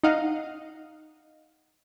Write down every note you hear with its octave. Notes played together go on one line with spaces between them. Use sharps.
D#4 D#5 F5 F#5